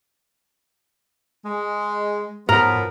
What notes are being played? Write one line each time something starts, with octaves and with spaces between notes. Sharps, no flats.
G#3
G#2 F3 F#3 B3 A#4